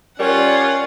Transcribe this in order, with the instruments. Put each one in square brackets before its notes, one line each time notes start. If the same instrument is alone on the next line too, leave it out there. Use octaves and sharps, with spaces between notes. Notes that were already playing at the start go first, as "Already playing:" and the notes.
[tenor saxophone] G3 [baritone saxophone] C#4 [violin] F4 F#5 [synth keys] A#4 D5